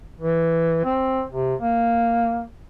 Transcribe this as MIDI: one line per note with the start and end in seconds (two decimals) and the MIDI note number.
0.20 0.84 52
0.84 1.23 60
1.31 1.55 48
1.61 2.43 58